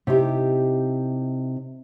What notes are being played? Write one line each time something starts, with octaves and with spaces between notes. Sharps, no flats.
C3 D#4 E4 G4